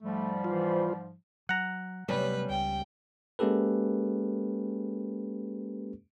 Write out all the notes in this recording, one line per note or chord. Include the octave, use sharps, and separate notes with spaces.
G#2 F3 G3 A3
E3 F4 C5
F#3 F#5 A#5
C3 F#3 G3 A3 B3 C#4 B4
C#2 G5
G#3 A#3 C#4 G4 A4 B4